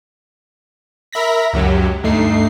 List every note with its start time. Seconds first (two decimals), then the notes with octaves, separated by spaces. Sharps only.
1.13 A#4 E5 B5 A#6 B6
1.53 C#2 F#2 F#3 G4
2.04 D2 G2 A3 D#4 C7